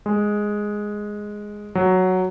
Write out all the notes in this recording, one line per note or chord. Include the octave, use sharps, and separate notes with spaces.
G#3
F#3